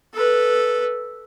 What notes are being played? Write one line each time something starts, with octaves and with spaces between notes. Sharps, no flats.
A4 B4